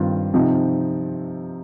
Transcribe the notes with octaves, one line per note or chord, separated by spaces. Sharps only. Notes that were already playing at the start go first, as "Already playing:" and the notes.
Already playing: G2 D#3 C4 F4
C3 F3 C4 D#4